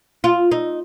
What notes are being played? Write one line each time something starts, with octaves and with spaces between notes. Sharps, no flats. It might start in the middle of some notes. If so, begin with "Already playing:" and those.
F4
D#4